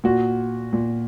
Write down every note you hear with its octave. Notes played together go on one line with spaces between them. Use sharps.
A#2 F#4
A#2